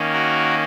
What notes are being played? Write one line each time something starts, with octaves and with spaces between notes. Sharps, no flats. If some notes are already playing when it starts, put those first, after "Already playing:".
Already playing: D#3 A#3 C#4
F#4 A#4